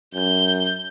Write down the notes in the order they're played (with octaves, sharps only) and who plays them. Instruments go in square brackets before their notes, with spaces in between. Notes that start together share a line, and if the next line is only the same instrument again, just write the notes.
[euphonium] F#2 [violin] G6